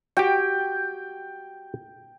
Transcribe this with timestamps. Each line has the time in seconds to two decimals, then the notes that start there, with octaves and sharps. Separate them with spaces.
0.17 F#4 G4 G5